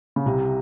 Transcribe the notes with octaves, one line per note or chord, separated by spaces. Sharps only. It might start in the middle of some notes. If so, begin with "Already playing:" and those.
C#3
C2 C3